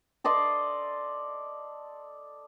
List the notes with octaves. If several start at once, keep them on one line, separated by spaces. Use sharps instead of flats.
A4 D5 D#5 C6